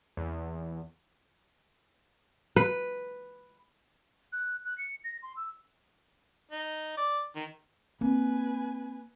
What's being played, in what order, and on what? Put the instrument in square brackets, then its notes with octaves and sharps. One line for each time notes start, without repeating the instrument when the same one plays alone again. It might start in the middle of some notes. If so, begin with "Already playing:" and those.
[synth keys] E2
[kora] B4
[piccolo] F#6
F#6
C#7
A#6
C6
E6
[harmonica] D#4
D5
D#3
[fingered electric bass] A#3 [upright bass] C4 [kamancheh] B4 G#5